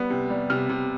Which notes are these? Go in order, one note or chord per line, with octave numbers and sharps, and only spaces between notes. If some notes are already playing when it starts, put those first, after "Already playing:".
Already playing: G3 B3
C3
G3
C3 F6
C3